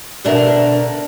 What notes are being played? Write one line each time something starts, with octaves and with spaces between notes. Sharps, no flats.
B2 D3 D4 A#4 E5